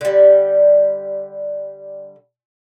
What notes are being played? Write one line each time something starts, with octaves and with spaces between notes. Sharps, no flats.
D3 G3